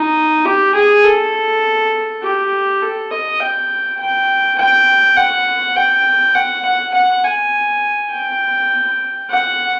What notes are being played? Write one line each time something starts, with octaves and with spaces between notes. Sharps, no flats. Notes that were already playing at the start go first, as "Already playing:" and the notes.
Already playing: D#4
G4
G#4
A4
G4
A4
D#5
G5
G5
G5
F#5
G5
F#5
F#5
F#5
G#5
G5
F#5